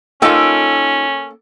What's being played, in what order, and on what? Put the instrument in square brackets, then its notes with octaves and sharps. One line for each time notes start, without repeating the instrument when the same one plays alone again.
[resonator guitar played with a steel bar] A#3 A4 G5 [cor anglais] C#4 [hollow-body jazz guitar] D#4 F4